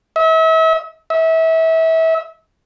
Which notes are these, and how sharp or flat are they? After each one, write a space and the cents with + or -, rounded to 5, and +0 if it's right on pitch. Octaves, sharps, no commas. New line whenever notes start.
E5 -40
E5 -30